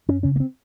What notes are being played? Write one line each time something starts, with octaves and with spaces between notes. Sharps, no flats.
F#2 C#4
C#3 C#4
A#3
C4